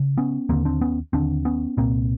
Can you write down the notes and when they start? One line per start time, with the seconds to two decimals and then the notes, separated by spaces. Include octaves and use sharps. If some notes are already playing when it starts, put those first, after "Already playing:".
Already playing: C#3
0.18 B3 C#4
0.49 D#2 D3 A#3 C4
0.65 C4 D4
0.81 B3 C#4
1.13 D#2 D3 C4 D4
1.45 B3 C#4
1.77 C2 A#2 A#3 C4